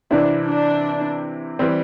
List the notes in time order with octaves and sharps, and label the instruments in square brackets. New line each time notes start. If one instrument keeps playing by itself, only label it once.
[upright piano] C3 E3 C4 E4 [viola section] D4
[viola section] D4
[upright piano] E3 G3 C4